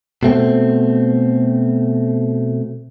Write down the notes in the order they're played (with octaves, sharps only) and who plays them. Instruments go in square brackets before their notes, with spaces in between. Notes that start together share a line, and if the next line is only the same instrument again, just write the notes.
[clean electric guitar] B2 A3 C4